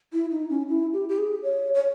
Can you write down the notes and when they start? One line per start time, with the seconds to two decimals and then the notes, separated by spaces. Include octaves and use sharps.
0.13 E4
0.31 D#4
0.50 C#4
0.69 E4
0.93 G4
1.09 G4
1.18 G#4
1.43 C#5
1.74 C#5